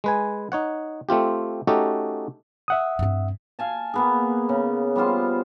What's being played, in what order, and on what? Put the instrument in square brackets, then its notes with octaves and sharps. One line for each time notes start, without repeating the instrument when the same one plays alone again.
[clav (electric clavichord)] G#3 B4 G#5
D#4 C#5 F#5
A3 C4 F4 G4
A3 C#4 D#4 F#4 G4 A4
[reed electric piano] E5 F#5 D#6
[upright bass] G2 C4
[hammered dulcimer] F5 G#5 A5
A#3 B3 G#4
C#3
G3 B3 F4 C5